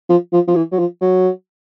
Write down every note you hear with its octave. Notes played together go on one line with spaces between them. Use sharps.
F3
F3
F3
E3
F#3
F3
F#3